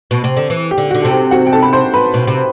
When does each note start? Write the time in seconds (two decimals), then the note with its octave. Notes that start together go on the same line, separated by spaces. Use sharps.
0.11 B2
0.24 C3
0.37 D3
0.50 E3
0.71 G4
0.78 D3
0.91 F#4
0.94 D3
1.02 C3 A4
1.11 G4
1.31 F#4 F#5
1.46 G5
1.53 A4 A5
1.62 B5
1.73 C5 C6
1.94 B4 B5
2.14 B2
2.27 C3